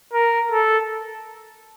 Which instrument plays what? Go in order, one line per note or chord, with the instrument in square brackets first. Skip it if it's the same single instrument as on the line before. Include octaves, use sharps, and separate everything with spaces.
[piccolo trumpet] A#4
A4